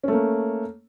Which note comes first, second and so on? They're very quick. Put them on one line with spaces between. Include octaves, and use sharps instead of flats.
C#4 A3 A#3